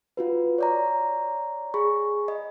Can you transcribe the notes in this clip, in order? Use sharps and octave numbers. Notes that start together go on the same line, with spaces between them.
F4 F#4 B4
C#5 D5 A#5
G#4 B5 C#6
D#5